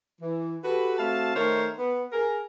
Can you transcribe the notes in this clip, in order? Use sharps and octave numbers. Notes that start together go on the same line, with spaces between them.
E3
F#4 G4 A4 B4
A3 C4 F#4 F5 A5
D#3 A3 D#4 A#4 C5 C#5
B3
G#4 A#4